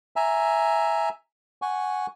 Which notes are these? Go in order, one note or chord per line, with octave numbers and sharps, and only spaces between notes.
E5 G#5 A#5
F#5 G#5 C#6